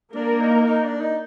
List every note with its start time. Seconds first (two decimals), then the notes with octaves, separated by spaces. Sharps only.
0.15 A#3 D4 A#4
0.41 D#4
0.66 D#4
0.84 D4
1.01 D#4